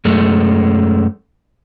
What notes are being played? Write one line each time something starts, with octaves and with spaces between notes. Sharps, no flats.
F#2 G#3 A3